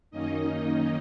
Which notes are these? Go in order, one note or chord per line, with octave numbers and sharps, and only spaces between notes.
F#2 D#3 A#3 C#4 D#4 D#5